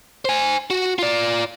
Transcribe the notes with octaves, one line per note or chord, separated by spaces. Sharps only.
C5 G#5
F#4
F4 D5